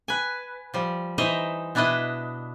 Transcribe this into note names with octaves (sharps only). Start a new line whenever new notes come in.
B4 G#5
F3 G3
E3 D#4 C5 D#5 E5 A#5
B2 D4 E4 B4 D#5